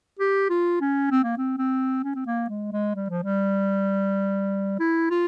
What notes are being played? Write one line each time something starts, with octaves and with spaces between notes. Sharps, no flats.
G4
F4
C#4
C4
A#3
C4
C4
C#4
C4
A#3
G#3
G#3
G3
F3
G3
E4
F4